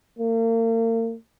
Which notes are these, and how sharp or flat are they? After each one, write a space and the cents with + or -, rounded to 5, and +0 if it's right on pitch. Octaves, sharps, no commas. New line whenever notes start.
A#3 -40